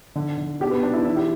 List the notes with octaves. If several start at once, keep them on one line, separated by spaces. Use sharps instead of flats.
D3
D3
B2 G4
B3
B2 D4
E4
E3 E4
G4